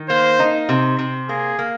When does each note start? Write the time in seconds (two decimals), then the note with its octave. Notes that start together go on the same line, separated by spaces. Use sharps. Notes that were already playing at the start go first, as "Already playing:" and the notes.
Already playing: D#3
0.09 A#3 C5
0.39 D#4
0.69 C3
0.99 C3
1.29 A#3 G#4
1.59 A#3